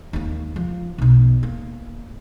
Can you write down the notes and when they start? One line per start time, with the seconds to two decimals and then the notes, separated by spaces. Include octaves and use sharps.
0.13 D#2 A#3
0.56 F3
0.98 B1 B2
1.43 A#3